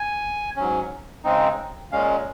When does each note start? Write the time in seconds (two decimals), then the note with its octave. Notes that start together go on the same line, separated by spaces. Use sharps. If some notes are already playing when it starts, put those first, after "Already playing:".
Already playing: G#5
0.56 G#2 F#3 C#4
1.24 C#3 G#3 C4 D#4
1.92 A#2 G#3 C#4 F5